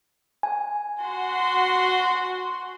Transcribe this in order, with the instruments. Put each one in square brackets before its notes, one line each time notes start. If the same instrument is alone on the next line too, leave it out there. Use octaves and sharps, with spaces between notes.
[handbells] G#5
[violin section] F#4 C6